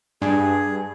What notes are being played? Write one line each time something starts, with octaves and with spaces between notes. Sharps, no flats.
G2 G#4